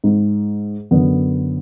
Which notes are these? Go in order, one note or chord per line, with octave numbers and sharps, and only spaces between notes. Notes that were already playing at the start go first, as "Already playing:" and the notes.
G#2
F#2 D3 B3